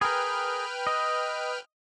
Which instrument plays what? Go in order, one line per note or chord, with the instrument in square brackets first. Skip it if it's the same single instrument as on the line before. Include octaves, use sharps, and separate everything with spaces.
[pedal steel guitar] G#4 A#4 [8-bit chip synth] B4 G5 F6
[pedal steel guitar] D#5